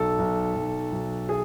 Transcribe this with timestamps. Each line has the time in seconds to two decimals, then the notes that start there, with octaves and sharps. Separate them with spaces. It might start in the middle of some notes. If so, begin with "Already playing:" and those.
Already playing: B1 A4
0.18 B1
0.55 B1
0.92 B1
1.29 G#4